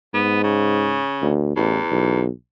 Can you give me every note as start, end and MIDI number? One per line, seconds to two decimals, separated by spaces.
0.14 1.03 44
0.14 0.43 59
0.44 1.30 49
1.22 1.52 38
1.57 1.78 33
1.57 2.22 40
1.91 2.29 35